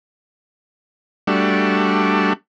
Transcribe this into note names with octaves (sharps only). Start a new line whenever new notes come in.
G3 A3 D4 F#4